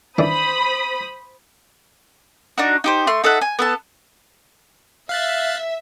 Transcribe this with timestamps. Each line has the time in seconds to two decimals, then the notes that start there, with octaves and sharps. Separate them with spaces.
0.18 D#3 E3 D4 C5 B5 D#6
2.58 D4 D#4 F#4
2.84 D#4 G4 C5
3.07 A3 C6
3.24 D#4 A4 E5 F#5
3.41 G#5
3.59 B3 A4 A5
5.09 E5 F5 F#6 A6